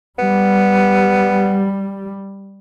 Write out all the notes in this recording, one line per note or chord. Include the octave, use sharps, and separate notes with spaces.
G3 B3